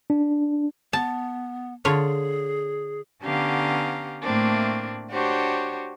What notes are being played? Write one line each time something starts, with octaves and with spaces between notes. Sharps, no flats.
D4
B3 A5
D3 F4 G#4 C#5
D3 B3 C#4 G4 F5 A#5
A2 A3 A#3 C4 D4
D4 F#4 G4 C5 C#5